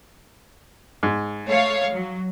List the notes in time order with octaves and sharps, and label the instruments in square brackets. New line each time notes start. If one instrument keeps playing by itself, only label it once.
[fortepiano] G#2
[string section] A3 C#5 F5
F#3